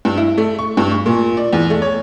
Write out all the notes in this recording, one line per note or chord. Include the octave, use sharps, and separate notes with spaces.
G2
E4
A3
C#6
G2
C#6
A#2
D5
E2
A3
C#5